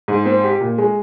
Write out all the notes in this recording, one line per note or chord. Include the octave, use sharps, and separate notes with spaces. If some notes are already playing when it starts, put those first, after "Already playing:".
G#2
C4
G4
A#2
G#3